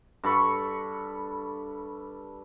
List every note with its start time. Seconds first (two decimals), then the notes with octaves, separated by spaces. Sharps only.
0.24 G2 A4 B5 C#6